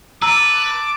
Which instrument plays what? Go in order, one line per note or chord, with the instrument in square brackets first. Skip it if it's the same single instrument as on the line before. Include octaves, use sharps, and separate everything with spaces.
[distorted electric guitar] B4 [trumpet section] A5 D6 [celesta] A#5 E6